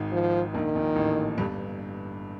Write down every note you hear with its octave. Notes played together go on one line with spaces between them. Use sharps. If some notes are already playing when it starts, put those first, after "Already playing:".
Already playing: G#1 G#2
F3
A#1 A#2 D#3
A#1 A#2
A1 A2
G1 G2